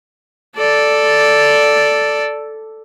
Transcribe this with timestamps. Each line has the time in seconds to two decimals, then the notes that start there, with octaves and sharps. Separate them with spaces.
0.56 A4 D5